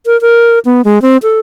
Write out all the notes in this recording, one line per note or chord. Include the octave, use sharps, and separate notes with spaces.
A#4
A#4
B3
G#3
C4
A4